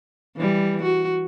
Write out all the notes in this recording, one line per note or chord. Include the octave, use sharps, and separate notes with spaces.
E3 G3
F#4